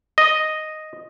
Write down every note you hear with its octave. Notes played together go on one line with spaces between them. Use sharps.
D#5